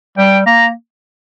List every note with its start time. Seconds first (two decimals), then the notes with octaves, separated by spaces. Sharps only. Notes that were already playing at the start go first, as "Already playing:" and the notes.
0.18 G3 G5
0.46 A#3 A#5